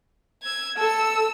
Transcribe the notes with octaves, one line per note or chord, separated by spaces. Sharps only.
E6 G#6
A4 E6